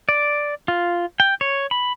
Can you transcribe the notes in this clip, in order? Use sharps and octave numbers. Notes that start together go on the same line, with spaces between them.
D5
F4
G5
C#5
B5